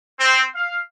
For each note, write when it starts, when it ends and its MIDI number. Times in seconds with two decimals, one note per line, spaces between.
0.19 0.42 60
0.54 0.77 77